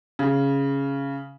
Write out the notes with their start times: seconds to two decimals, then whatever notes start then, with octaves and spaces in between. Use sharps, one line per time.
0.19 C#3